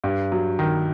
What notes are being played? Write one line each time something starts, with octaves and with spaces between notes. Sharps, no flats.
G2
F#3
D#3